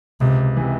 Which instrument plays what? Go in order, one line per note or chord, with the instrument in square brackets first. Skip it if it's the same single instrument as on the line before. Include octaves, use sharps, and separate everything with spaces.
[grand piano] C#2 [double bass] C3
[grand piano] C3 E3